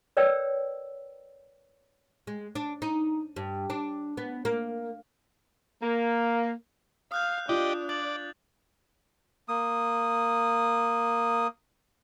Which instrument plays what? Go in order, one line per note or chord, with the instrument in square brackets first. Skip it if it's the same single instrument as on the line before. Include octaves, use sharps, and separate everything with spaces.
[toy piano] A#4 B4 C#5 D5 G5 E6
[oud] G#3
D4
D#4
G2
D4
B3
A#3
[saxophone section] A#3
[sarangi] F5 [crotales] D#6 F#6 G6
[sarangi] D4 [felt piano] F4 [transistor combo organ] G4 D5 D#5
[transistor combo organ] D5 [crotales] A6 F#7
[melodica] A#3 D#6